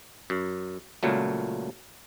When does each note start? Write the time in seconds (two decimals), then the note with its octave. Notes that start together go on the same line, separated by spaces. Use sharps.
0.30 F#2
1.03 C#2 A#2 F#3 A3